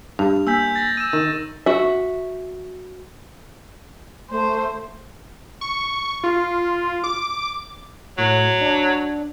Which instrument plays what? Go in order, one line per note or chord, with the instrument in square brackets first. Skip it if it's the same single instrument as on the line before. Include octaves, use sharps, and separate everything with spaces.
[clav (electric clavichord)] G2 [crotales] F7
[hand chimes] A#3 G#5 B6 [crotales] E6 G6
[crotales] A6 A#6
[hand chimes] E6 [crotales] D#7 E7
[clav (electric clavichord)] D#3
[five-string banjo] F#4 E5
[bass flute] A3 [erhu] C5
[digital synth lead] C#6
F4
D6
[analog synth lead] A2 [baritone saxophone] F#3
[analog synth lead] D4